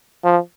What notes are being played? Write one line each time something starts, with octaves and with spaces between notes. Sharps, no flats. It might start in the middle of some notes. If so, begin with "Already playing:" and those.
F3